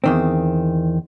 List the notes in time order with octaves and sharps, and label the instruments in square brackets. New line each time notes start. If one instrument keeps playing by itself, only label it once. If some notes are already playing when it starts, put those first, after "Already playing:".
[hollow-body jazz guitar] E2 D#3 C4